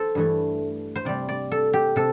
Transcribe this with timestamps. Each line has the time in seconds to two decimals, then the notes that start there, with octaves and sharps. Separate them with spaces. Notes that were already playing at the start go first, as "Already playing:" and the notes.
Already playing: A4 C5
0.15 G2 E3 A3
0.95 C5
1.05 C3 G3 D5
1.29 D5
1.51 A4
1.73 G4
1.96 C3 A4